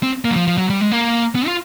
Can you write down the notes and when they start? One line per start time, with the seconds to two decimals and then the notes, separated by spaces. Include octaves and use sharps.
0.03 C4
0.25 A#3
0.31 F#3
0.36 F3
0.47 F3
0.58 F#3
0.70 G3
0.81 G#3
0.91 A#3
1.35 B3
1.47 F4